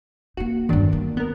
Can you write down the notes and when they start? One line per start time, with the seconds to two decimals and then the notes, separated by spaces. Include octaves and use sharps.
0.37 A#3 D#4 F#4
0.69 E2 G2 D#3 F#3 D4
0.92 A#3
1.17 B3 A#4